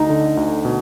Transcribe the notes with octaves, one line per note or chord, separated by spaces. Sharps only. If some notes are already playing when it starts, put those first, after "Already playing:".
Already playing: D2 D#4
D3
D2
B2